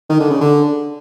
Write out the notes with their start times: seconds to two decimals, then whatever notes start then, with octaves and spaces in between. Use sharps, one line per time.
0.09 D#3
0.20 D3
0.30 C#3
0.41 D3